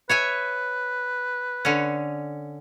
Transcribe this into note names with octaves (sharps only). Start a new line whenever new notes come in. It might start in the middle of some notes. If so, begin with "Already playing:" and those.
B4 C#5 E5 G#5
D3 C#4